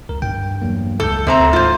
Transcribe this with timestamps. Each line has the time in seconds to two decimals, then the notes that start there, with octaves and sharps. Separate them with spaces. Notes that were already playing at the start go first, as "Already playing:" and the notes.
0.09 C2 A#4
0.22 G2 G5
0.62 E2 F#3 A#3
1.00 C#2 A4 G6
1.27 D2 C3 C4 A#5
1.53 D#2 G#2 F4 C5